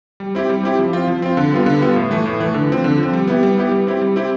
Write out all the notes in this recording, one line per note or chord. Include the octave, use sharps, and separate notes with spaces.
G3
C4 E4 G4
G3
C4 E4 G4
F3
C4 F4
F3
C4 F4
D3
G3 B3 F4
D3
G3 B3 F4
A2
E3 A3
A2
E3 A3
D3
F3 C4
D3
F3 C4
G3
B3 E4 G4
G3
B3 E4 G4
G3
C4 E4 G4
G3
C4 E4 G4